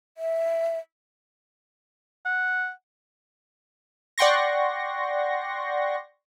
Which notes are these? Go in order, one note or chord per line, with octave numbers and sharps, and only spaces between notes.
E5
F#5
D5 F#5 G5 C6 C#6 A#6